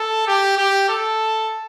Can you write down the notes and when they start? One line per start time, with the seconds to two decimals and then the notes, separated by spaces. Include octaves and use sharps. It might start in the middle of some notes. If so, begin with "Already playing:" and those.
Already playing: A4
0.27 G4
0.57 G4
0.89 A4